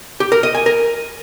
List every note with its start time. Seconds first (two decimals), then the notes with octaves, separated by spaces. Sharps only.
0.20 G4
0.32 A#4
0.43 D#5
0.55 G#5
0.66 A#4